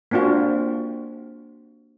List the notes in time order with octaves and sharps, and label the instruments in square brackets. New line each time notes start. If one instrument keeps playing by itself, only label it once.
[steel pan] A#3 C4 D4 F4 F#4